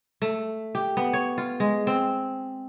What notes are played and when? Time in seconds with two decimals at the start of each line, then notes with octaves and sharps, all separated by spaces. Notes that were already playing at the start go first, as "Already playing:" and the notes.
0.22 A3
0.75 G4
0.97 B3
1.13 C#5
1.38 F4
1.60 G#3
1.87 C4